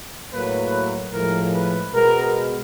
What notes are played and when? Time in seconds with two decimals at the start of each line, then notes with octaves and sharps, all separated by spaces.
0.32 A2 F#3 A#3 B4
1.13 A2 F3 G#3 A#4
1.53 B4
1.93 B2 G#3 B3 A#4